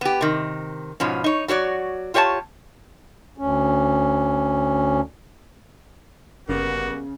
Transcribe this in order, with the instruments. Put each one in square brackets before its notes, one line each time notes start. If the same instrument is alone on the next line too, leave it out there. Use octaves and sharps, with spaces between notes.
[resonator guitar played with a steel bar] B3 G4
C3 D#3
G#2 B2 F3 C#4
D#4 C#5
F#3 F#4 C#5 D5
F4 G4 C#5 F#5 A5
[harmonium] D2 C#4
[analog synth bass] G1 [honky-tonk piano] C#3 [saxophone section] G3 A#3 B3 [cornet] F#4